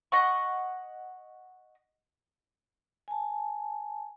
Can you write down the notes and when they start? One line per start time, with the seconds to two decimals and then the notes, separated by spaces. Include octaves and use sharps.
0.12 D#5 F#5 C#6
3.08 G#5 A5